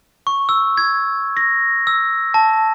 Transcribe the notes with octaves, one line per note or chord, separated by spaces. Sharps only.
C#6
E6
G#6
A#6
E6
A5